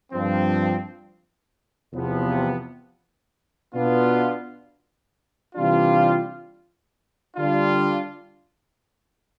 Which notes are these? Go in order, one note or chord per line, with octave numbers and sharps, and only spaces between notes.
G2 F3 C4
E2 C3 F3 B3
B2 B3 D4 F4
C3 E3 G3 D4 F4
D3 G3 D4 F4